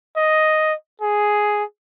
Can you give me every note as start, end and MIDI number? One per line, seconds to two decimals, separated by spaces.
0.17 0.74 75
1.02 1.64 68